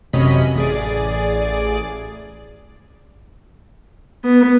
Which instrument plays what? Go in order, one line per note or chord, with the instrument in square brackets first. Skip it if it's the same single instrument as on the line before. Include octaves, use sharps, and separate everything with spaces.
[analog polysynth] A1 F#2 C3 C#4 D#5 B5
A1 G#4 D5
[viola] B3